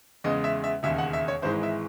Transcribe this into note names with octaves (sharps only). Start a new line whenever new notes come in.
E2 C#3 G#3 D#5
E5
E5
E1 D#2 C#3 E5
F#5
E5
C#5
G#1 G#2 E3 G#3 C5
E5